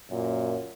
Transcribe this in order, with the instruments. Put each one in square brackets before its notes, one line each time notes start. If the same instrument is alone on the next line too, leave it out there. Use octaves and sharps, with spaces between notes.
[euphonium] F#2 [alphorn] A#2